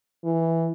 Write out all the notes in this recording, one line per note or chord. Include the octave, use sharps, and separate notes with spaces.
E3